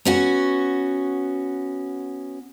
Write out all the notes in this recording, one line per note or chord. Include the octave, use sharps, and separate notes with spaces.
B3 C#4 F#4